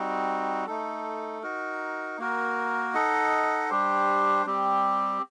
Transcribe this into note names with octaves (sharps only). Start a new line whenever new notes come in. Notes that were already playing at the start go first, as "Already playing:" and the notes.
Already playing: G3 C4 D#4 F#4
A3 D#4 A4
D#4 F#4 A#4
A#3 F#4 A#4
D#4 A4 D#5 F#5
G3 D4 G4 C5
G3 C4 G4